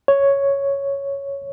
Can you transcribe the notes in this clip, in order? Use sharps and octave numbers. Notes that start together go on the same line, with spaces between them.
C#5